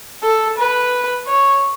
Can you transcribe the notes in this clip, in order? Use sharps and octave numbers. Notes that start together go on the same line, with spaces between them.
A4
B4
C#5